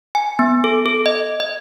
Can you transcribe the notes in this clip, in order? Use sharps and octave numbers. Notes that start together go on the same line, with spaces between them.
G#5
B3
A4
A4
D#5
D#5